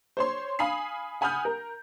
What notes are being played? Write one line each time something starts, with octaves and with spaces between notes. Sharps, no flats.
C5 C#5 C6
F5 G#5 B5 D#6 C7
F#5 G#5 B5 D#6 F6 G6
A#4